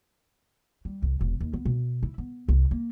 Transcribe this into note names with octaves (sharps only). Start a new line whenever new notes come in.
G3
C2
E1
D#2
B3
B2
E4
B3
C2
A#3